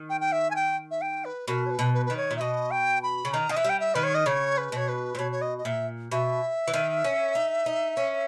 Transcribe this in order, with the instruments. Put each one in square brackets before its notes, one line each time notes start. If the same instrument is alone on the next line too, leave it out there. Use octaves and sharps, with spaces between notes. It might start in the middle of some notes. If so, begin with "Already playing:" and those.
Already playing: [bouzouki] D#3
[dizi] G5
G5
E5
G#5
G5
E5
G5
B4
[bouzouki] B2 [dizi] A#4
[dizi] C#5
B4
[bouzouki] B2
[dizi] B4
[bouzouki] D#3 [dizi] B4
[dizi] C#5
[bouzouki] A#2
[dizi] E5
[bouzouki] B2 [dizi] D#5
[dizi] G5
B5
[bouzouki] C#3
[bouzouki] D#3 [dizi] A#5
[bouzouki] D#3 [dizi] D#5
[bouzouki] E3 [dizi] E5
[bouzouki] G3 [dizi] G5
[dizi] E5
[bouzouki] D#3 [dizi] B4
[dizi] C#5
D#5
[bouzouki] C#3 [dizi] C#5
[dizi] B4
[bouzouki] B2 [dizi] C#5
[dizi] B4
[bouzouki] A#2
[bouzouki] B2 [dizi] C#5
[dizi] C#5
D#5
D#5
[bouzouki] A#2 [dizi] E5
[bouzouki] B2 [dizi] E5
[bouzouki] E3
D#3
C#4
D#4
D#4
C#4